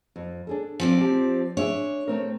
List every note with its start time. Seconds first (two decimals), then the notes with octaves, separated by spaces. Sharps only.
0.16 F2
0.47 D4 G#4 A4
0.80 F3 C4 D5
1.01 G4 A5
1.57 D4 G#4 C#5 E5
2.08 A3 C4 A#4